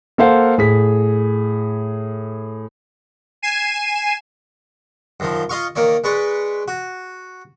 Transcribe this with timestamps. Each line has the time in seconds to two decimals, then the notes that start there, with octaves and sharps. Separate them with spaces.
0.18 A#3 A4 C5 F5 F#5
0.58 A2 G#4 B6
3.42 G#5 C7 D#7 E7
5.20 F#2 D#3 F3
5.49 F4 D#5 F5 C#6
5.76 D#3 A#3 C#5 D5
6.04 G#3 B4 D5 C#6
6.68 F#4